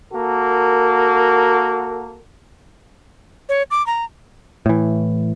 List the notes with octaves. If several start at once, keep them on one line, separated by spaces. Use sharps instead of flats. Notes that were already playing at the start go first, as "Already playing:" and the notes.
A#3 F#4 A4 A#4
C#5
D6
A#5
A2 E3